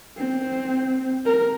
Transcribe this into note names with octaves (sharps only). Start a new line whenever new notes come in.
C4
A#4